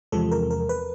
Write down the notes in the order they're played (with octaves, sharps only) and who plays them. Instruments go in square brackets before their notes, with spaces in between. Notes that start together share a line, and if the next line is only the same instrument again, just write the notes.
[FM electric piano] E2 C3 F3 G#3 A4
A#4
A#4
B4